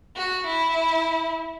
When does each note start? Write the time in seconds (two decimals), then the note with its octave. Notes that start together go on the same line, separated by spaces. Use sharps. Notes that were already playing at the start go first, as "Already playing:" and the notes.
0.16 F#4
0.47 E4